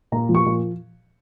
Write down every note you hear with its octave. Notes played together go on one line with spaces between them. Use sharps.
A#2 A#5
F3
C#6
A#2